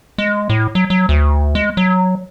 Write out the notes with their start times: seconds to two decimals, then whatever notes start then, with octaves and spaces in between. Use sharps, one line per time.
0.18 G#3
0.50 A2
0.75 F#3
0.90 F#3
1.09 D2
1.55 G#3
1.77 F#3